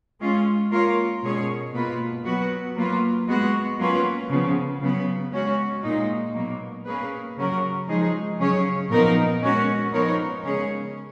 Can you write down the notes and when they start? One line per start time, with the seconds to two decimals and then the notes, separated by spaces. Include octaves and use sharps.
0.20 G#3 C#4 F4
0.71 A#3 F4 A#4 C#5
1.23 B2 G#3 C#4 G#4 C#5
1.74 B2 A#3 F4 B4
2.24 F#3 B3 F#4 B4
2.76 F#3 A#3 F4 B4
3.27 G#3 B3 F#4
3.78 F#3 A#3 C#4 F4 B4
4.29 C#3 F3 B3
4.80 C#3 F#3 B3
5.32 G#3 C#4 F#4
5.83 A#2 G#3 D#4
6.34 B2 F#3 A#3
6.85 A#3 C#4 G#4 B4
7.36 C#3 F#3 C#4 F#4 A#4
7.87 F3 G#3 D#4 G#4
8.39 C#3 F#3 C#4 G#4 C#5
8.90 A#2 F3 B3 D#4 A#4
9.41 G#3 C#4 F#4 C#5
9.92 F3 B3 D#4 A#4 C#5
10.43 C#3 G#3 C#4 G#4 C#5